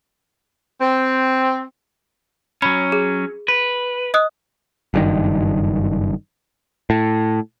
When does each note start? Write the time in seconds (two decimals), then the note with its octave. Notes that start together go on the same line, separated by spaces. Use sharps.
0.80 C4
2.62 F#3 C#4 B5
2.92 G#4
3.48 B4
4.14 D#5 D#6 F#6
4.94 F#1 G2 D#3
6.90 A2